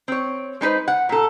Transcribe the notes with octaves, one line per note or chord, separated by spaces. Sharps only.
C4 C#5
G#3 D#4 B4 C5
F#5
A#2 A4